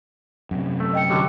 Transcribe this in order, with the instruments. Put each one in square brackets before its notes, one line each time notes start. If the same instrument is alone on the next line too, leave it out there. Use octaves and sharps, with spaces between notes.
[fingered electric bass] F#2 C3
[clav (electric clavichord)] A3
[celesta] D#5 G5 C#7
[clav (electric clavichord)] D3 F#3 G3